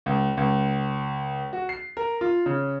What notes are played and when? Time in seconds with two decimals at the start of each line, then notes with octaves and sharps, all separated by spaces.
0.06 C#2
0.37 C#2
1.53 F#4
1.69 C7
1.97 A#4
2.21 F4
2.46 C#3